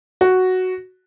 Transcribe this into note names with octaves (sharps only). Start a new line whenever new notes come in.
F#4